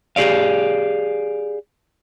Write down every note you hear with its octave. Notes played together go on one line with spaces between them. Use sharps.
G4 G#4 D5 F5